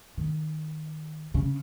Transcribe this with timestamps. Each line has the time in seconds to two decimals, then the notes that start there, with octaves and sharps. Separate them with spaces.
0.18 D#3
1.34 C#3